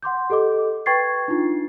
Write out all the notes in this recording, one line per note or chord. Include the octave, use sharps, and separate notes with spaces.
F#5 C6 D6 G6
G4 A4 D#5 D6
B4 G5 C#6 G#6 A6 C7
D4 D#4 F4